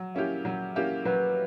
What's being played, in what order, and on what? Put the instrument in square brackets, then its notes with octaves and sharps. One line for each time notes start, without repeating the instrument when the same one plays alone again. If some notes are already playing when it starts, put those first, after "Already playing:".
Already playing: [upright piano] F#3
A#3 C#4 E4 G4
F#3
A#3 C#4 E4 G4
[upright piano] F#3 [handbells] B4